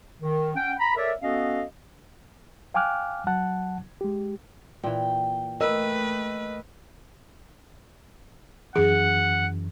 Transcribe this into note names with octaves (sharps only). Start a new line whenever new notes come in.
D#3
C#4 F#5 G5
A#5 B5
A4 A#4 C#5 D5 E5
B3 C#4 F#4 A4 D#5 F5
F5 G5 G#5 D6 F6 F#6
F#3 F#5 A5 F#6
G#3 G4
A#2 E3 G5
A3 A#4 B4 D#5 E6
F#2 E3 G#4 F#5